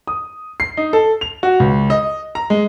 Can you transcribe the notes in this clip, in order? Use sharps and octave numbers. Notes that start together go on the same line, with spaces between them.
D#6
C7
D#4
A4
F7
F#4
C#2
D#5
A#5
G#3